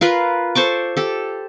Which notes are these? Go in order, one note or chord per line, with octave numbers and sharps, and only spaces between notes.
F4 A#4 B4
A4 C5 C#6 D6
G4 A4